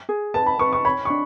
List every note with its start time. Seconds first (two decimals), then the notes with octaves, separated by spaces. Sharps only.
0.09 G#4
0.34 B4 A5
0.46 B5
0.59 B4 C#6
0.73 C#6
0.85 C#5 B5
1.05 C#6
1.10 D4